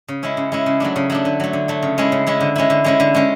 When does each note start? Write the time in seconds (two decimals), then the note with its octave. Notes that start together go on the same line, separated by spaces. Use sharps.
0.08 C#3
0.23 G#3 C#4 E4
0.37 C#3
0.52 G#3 C#4 E4
0.66 C#3
0.80 F#3 A3 D4
0.96 C#3
1.10 F#3 A3 D4
1.25 D3
1.40 F#3 A3
1.53 D3
1.68 F#3 A3
1.83 C#3
1.98 G#3 C#4 E4
2.12 C#3
2.27 G#3 C#4 E4
2.40 D3
2.56 G#3 C#4 E4
2.70 D3
2.84 G#3 C#4 E4
3.00 D3
3.15 G#3 C#4